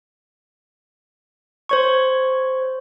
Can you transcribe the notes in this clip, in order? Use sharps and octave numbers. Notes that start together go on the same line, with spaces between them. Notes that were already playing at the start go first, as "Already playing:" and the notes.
C5 C#5 C#6